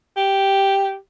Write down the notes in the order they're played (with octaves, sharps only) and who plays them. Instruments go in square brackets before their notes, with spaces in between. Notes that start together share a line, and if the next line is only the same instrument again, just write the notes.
[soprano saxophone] G4